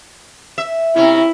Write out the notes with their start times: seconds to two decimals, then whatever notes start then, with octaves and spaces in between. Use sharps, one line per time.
0.58 E5
0.96 C3 C#4 E4